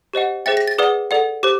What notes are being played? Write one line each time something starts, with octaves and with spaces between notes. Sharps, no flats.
G4 C5 D#5 F#5
G#4 C5 E5 G5 A6
A#6
A6
G#4 B4 D5 F#5 D#6
A4 D5 F#5
G4 C5 D6